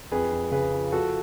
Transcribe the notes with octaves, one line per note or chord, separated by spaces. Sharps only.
F2 G#4 B4
F2
C#3 G#4 B4
F3
F3 F#4 A4